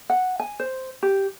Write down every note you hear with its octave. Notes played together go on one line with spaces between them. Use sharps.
F#5
G#5
C5
G4